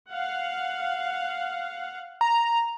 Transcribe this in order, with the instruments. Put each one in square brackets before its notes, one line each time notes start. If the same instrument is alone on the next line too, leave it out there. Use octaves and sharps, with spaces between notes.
[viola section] F5 F#5
[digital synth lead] A#5